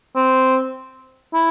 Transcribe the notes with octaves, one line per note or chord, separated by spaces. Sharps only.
C4
E4